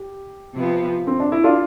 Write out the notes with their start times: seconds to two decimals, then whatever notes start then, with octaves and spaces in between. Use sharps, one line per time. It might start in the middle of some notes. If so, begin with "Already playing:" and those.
Already playing: G4
0.53 C3 F3 B3
1.07 C4
1.20 D4
1.32 E4
1.44 D4 F4